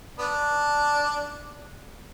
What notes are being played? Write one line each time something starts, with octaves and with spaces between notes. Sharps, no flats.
B3 D4